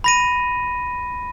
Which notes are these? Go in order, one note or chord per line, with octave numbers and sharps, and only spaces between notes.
B5 A#6 D#7